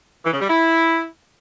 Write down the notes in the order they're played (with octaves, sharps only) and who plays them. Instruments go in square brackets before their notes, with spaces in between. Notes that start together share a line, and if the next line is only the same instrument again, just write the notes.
[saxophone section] E3
C#3
G3
E4